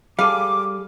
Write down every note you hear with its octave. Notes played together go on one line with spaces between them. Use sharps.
G3 G#4 A4 F5 D6